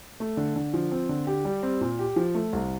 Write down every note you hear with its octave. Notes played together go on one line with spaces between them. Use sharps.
A3
D3
D3
F3
C4
D3
G4
G3
C4
A#2
G4
F3
A3
C2